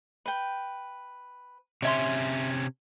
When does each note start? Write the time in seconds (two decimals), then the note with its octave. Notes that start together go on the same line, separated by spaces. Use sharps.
0.26 B4 G5
1.82 C3 C#4 C#5 E5 C6